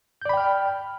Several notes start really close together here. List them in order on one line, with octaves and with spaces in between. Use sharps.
G6 D5 B5 G5 F6